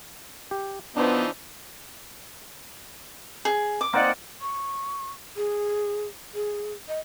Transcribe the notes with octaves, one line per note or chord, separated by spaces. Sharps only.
G4
E3 F3 B3 D4 D#4 C5
G#4
D6
A#3 C4 D#4 D5 D#5 F#5
C#6
G#4
G#4
D#5